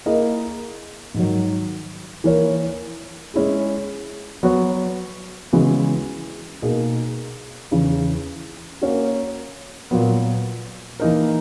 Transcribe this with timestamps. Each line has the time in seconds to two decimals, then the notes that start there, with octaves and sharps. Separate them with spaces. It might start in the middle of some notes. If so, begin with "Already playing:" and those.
0.06 A#3 E4 G#4 D#5
1.14 G#2 D#3 F#3
2.24 E3 A#3 E4 A#4 C#5
3.34 G#3 C#4 E4 G#4
4.43 F#3 B3 F#4 C#5
5.53 C#3 E3 G#3 B3 F#4
6.62 B2 A#3 D#4 G#4
7.71 E2 C#3 E3
8.82 A#3 C#4 F#4
9.91 A#2 F#3 B3
11.00 E3 A#3 D#4 A#4